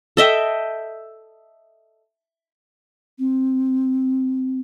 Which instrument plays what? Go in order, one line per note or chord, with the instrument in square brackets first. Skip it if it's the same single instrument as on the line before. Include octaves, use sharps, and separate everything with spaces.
[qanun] A4 D#5 E5 G5
[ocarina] C4